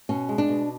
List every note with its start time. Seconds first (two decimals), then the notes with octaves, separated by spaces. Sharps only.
0.09 B2 C#4
0.29 G#3
0.38 D4
0.49 B2